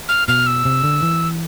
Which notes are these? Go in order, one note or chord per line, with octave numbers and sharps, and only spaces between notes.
F6
B2 F6
E6
C3
D3
E3